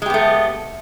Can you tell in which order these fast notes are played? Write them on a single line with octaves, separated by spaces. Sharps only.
G#3 G4 B3 A3